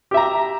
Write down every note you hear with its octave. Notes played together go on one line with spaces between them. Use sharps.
G4 E5 A#5